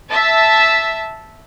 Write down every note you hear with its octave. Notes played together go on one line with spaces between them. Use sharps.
E5 A5